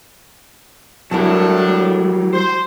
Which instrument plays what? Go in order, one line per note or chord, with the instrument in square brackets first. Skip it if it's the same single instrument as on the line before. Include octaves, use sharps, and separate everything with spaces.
[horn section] A2 D4 [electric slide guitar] F#3 G3 [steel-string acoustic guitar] E4 A#4 A5
[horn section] C5